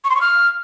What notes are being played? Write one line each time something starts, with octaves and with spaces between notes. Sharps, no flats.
C#6
C6
C#6
F6